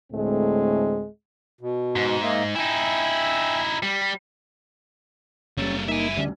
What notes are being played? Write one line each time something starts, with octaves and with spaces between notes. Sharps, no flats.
D2 A2 G#3 A3 C4
B2
G#2
A#3 D#5 E5
D#4 E4 E5 G5 G#5
G3
F#1 G3 A#3 C#4 A4
A#3 D#4 E5 G#5
D2 D3 G3 C#4